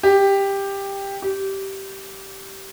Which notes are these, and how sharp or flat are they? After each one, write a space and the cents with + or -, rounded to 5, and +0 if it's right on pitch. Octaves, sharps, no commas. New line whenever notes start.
G4 +10
G4 -15